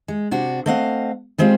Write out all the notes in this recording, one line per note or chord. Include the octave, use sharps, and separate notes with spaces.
G#3
C3 D4 F#4
A3 C4 D#5 F5 F#5
G3 G#3 C4 F4